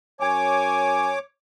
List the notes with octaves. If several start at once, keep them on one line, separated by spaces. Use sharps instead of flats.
F#2 C#5 G#5 D6